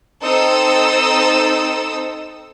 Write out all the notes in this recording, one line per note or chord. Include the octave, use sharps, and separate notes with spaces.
C4 D#4 A4 D#6 E6